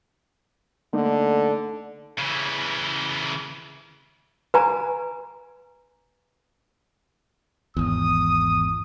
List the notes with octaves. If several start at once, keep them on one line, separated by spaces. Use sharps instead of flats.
D3 A3 A#3 D#4
C#3 E3
B4 G#5 A#5
G#1 E2 D#6